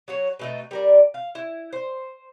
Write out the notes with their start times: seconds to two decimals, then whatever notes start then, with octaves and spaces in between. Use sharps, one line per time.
0.08 F#3 F#4 C#5
0.39 B2 A3 D#4
0.71 G3 A#4 D5
1.14 F5
1.35 E4
1.73 C5